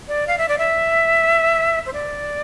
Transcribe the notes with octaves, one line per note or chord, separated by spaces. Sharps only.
D5
F5
E5
D5
E5
C5
D5